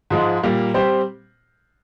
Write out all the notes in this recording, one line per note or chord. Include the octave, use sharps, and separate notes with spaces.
G#2 F3 G#3
A#2 G3 A#3
G3 C4 G4 C5